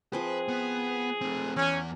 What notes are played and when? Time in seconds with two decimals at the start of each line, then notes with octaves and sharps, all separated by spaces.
0.13 F3 C4 G#4 B4
0.48 B3
1.21 A3 C4
1.57 E2 E3 C#4 D5